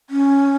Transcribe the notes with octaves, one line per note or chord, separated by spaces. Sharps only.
C#4